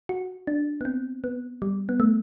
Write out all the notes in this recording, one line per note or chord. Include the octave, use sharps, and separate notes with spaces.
F#4
D4
B3
C4
B3
G3
B3
A3